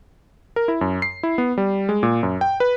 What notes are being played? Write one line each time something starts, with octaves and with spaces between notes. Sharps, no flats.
A#4
E4
F#2
C7
E4
B3
G3
G#3
A#2
F#2
G5
B4